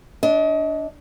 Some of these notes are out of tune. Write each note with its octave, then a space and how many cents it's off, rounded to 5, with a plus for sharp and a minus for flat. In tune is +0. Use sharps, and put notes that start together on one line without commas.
D4 -15 D#5 +30